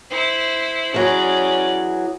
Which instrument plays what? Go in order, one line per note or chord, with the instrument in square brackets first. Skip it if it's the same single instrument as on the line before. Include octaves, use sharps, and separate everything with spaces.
[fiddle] E4 C5
[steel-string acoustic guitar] E3 F#3 G#4 [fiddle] C#4 D5